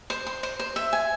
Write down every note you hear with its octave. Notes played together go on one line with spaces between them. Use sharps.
C5
C6
C5
C5
E5
G#5